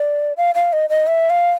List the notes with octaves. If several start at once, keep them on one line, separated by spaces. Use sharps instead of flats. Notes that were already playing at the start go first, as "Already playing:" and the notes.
Already playing: D5
F5
F5
D#5
D#5
E5
F5